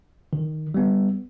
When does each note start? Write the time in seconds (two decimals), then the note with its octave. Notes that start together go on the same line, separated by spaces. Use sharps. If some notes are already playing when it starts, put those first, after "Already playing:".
0.33 D#3
0.74 G3 B3